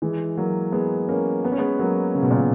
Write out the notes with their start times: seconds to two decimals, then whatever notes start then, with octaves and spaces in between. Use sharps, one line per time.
0.02 E3 G#3
0.37 F#3 A#3
0.72 G#3 B3
1.08 A#3 C#4
1.44 B3
1.52 C#4
1.58 G#3 B3
1.79 F#3 A#3
2.15 C#3
2.23 B2
2.31 A#2
2.38 B2